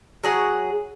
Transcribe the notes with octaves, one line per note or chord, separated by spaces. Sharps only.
F#3 G#4 F#5